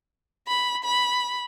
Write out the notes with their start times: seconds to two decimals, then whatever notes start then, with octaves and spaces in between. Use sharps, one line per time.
0.47 B5
0.84 B5